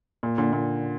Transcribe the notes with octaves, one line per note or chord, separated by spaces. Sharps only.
A#2
A#2 D3
A#2